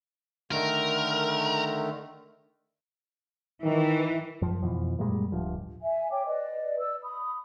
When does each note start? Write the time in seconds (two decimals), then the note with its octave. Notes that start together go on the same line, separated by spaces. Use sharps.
0.52 D3 D#3 A3 A#4
3.64 D#3 E3
4.42 F#2 F3
4.63 F2 B2 E3 F3
4.99 F#2 A#2 G3 G#3
5.32 D1 G2 F3
5.82 E5 G#5
6.12 C#5 G5 D6
6.27 B4 D5 D#5
6.79 D5 E6
7.03 B5 D#6